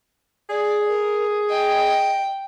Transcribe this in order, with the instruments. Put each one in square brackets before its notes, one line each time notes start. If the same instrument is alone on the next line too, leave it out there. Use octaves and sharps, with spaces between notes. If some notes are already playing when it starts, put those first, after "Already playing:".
[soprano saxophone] G#4 [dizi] D5
[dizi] A#4
[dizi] D#5 [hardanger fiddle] G5